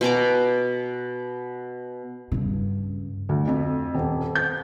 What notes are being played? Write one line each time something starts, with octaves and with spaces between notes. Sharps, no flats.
B2 G#5 A#5 D6
G2 C#3
D2
F2
D#1
G6